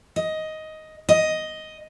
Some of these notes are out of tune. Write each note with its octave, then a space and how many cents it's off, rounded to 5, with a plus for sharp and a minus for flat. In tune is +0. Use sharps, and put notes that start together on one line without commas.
D#5 +10
D#5 +5